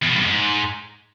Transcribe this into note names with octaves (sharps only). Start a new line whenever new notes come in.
E2
B2
G2
F2
G#2